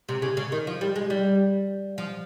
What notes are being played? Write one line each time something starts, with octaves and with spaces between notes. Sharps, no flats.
C3
C#3
C#3
D#3
F3
G3
G#3
G3
F3